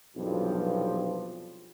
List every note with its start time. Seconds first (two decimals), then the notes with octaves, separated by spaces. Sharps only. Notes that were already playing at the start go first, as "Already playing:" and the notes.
0.17 B1 E2 G2 C3 F3